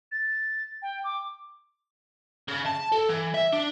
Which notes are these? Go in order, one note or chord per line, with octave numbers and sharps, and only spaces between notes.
A6
G5
D6
C#3
A5
A4
E3
E5
D4